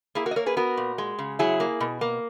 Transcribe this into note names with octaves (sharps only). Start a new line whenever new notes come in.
A#3 E4 G#4
F#4 A#4
D#5
A#3 A#4 C#5
G#4 B4
B3 F#4 A#4
A#2
G#3
C#3
F#3 E4 G#4
A#3
B2
A#3